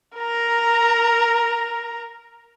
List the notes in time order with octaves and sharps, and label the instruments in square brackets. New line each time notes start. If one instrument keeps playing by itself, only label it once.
[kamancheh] A#4 A#5